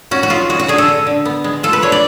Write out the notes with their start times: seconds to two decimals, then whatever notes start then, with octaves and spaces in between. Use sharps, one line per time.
0.11 C#4 F#4
0.23 F#4
0.30 G#3 F4
0.49 G#3 F#4
0.59 F#4
0.68 D3 G#4
0.78 A4
0.88 D3
1.07 D3
1.25 B3
1.44 G#3
1.63 F4 A4
1.73 B4
1.82 D4 C#5
1.92 D5